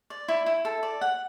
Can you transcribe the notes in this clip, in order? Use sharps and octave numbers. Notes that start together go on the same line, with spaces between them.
D5
E4
E4
A4
D5
F#5